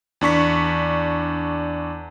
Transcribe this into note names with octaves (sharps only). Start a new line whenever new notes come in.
E2 D4 C#6 B6